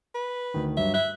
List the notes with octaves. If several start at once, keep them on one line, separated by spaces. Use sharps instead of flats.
B4
D2 D#3
G2 F#3 E5
E5 F#6